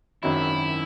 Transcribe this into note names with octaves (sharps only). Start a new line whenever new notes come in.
G#1 F#2 D#3 F#3 E4